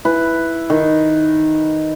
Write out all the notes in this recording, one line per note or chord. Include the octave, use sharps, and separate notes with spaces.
E4 B4
D#3